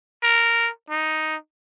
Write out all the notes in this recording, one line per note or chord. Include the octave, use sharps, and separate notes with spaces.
A#4
D#4